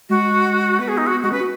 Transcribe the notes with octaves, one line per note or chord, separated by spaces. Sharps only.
G#3 F#4
B3 B4
G#4
D#4
F#4
B3
G#3 F#4
C#4 B4
F#4